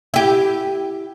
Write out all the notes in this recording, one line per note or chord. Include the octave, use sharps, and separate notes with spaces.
E4 G4